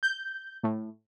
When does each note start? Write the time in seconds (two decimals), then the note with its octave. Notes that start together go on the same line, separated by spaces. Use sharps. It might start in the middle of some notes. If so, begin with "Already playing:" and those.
0.03 G6
0.63 A2